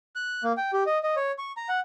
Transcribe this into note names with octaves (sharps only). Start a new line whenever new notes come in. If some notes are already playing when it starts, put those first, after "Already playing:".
F#6
A#3
G5
G4
D#5
D#5
C#5
C#6
A#5
F#5